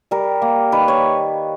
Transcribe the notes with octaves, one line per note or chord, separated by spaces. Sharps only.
G3 A#4
A#3
D#3 B4
C#5